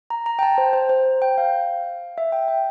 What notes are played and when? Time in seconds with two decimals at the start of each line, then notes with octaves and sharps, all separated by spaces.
0.10 A#5
0.26 A#5
0.39 G5
0.43 A5
0.58 C5
0.73 C5
0.89 C5
1.22 G5
1.38 F5
2.18 E5
2.32 G5
2.48 G5